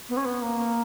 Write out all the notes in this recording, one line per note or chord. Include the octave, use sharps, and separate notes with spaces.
B3
C#4
B3
A#3